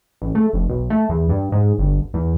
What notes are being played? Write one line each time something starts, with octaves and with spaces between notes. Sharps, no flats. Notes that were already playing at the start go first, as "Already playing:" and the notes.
A1
A3
F1
B1
A3
E2
G2
G#2
G1
E2